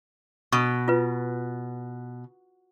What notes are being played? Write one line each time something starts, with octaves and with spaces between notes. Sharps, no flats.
B2 C#6
F4 B4